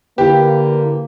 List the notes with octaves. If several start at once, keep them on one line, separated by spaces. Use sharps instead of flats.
D3 A#3 E4 G4 B4